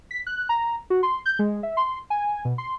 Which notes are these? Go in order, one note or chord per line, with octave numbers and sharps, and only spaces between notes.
B6
F#6
A#5
F#4
C6
G6
G#3
E5
C6
G#5
B2
C6